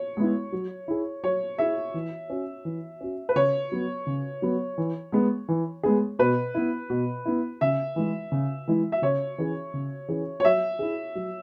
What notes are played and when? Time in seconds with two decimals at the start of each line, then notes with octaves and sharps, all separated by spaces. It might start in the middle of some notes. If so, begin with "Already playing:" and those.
Already playing: C#5
0.17 G#3 B3 E4
0.52 F#3
0.88 E4 G#4
1.23 F#3 C#5
1.58 E4 G#4 E5
1.94 E3
2.30 C#4 F#4
2.65 E3
3.01 C#4 F#4
3.29 B4
3.36 C#3 C#5
3.72 F#3 B3
4.07 C#3
4.42 F#3 B3
4.78 E3
5.12 G#3 B3 G#4
5.49 E3
5.83 G#3 B3 G#4
6.19 B2 B4
6.55 B3 E4
6.90 B2
7.25 B3 E4
7.61 C#3 E5
7.96 E3 G#3 E4
8.32 C#3
8.68 E3 G#3 E4
8.92 E5
9.02 C#3 C#5
9.38 E3 C#4 G#4
9.74 C#3
10.08 E3 C#4 G#4
10.40 C#5
10.44 F#3 E5
10.79 E4 G#4
11.15 F#3